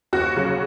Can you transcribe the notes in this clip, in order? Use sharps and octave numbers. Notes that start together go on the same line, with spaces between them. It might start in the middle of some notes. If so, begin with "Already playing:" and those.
D#2 F#4
C#3 F#3